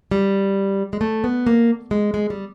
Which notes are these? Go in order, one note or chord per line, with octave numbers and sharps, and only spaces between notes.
G3
G#3
A3
B3
A#3
G#3
G#3
G3